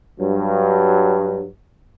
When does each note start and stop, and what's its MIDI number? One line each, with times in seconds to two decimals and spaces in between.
0.19 1.46 43
0.19 1.46 54